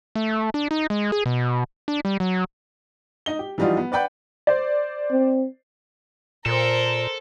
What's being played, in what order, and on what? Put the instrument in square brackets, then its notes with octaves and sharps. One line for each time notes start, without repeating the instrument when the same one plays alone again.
[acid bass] A3
D4
D#4
G#3
G#4
B2
D4
G3
F#3
[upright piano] D#4 D#5 G7
G4
E3 F3 G3 D#4 F4 F#4
B3
B4 D5 F#5 G5 B5 G6
[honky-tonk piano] C5 D5
[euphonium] C4
[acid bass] A#2 [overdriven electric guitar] A4 [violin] A#4 C5